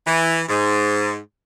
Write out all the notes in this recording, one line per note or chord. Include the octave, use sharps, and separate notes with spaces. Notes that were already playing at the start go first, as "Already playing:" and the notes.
E3
G#2